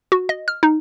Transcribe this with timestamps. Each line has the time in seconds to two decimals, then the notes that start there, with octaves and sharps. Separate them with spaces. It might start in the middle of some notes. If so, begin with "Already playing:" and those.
0.12 F#4
0.29 D#5
0.48 F6
0.63 D#4